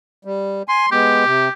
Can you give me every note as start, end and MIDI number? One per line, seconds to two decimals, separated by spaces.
0.25 0.63 55
0.68 0.86 80
0.68 0.91 84
0.91 1.25 56
0.91 1.25 59
0.91 1.52 67
1.26 1.49 48